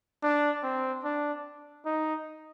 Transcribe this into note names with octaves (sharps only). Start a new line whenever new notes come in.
D4
C4
D4
D#4